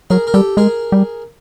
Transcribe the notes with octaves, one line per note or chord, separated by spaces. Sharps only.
F#3 G#4 A#4
A#4
G3 G4 A4
G#3 G#4 A#4
G3